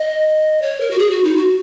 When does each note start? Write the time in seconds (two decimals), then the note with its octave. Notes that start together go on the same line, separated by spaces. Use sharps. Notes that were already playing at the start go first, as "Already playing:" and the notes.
Already playing: D#5
0.62 C#5
0.81 A#4
0.91 F#4
0.99 G#4
1.11 F#4
1.24 D#4
1.36 F#4